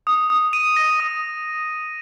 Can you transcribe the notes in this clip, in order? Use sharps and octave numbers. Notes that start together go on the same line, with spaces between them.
D#6
D#6
D#7
A#6
D#6